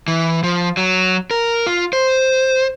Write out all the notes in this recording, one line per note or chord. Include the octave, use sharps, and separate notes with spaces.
E3
F3
F#3
A#4
F4
C5